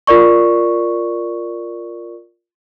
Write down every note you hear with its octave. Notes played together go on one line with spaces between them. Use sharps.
F4 A#4 D5 C#6